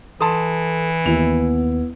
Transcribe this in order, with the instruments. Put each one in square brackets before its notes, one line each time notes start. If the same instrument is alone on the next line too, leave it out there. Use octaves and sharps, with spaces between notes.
[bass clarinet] E3 [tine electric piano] A4 [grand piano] A5 C6 D#6
[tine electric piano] D#2 [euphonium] B3 [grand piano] E4 F7